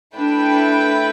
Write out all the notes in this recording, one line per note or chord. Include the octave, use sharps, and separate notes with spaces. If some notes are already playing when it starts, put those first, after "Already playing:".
A3 D4 E4 B4 G5